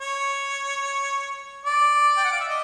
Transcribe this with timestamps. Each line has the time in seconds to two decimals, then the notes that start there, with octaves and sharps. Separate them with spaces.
0.01 C#5
1.66 D5
2.17 G5
2.24 F#5
2.32 F5
2.40 E5
2.48 D#5